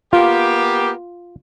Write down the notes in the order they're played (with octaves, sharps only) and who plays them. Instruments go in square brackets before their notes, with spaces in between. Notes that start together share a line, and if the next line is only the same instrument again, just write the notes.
[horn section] A#3 B3 G4 [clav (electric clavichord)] F4